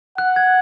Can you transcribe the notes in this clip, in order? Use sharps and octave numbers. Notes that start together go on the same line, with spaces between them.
F#5 F#6
G#6